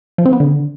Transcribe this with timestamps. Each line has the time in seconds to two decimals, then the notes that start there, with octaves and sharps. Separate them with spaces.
0.18 F3
0.26 C4
0.33 B3
0.40 D3